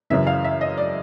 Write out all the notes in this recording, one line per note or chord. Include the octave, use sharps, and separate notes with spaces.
F#2 C#3 E3 E5
F5
E5
D#5
D5